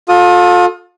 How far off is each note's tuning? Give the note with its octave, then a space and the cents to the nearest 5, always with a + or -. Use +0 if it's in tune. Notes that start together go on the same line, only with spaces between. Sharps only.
F4 +35 A4 +0 D#6 +0